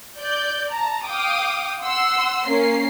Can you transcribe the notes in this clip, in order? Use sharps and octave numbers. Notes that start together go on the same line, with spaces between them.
D5 G6
A5 A#5
F5 G5 D6 D#6
F#5 C6 E6
A#3 C#4 C7